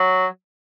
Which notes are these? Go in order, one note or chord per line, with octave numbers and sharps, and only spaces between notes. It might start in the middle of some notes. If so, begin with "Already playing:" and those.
Already playing: F#3